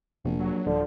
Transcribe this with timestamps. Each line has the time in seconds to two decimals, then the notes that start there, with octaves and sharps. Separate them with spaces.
0.25 F1 A#1
0.39 F#3
0.67 D#1 D3 F3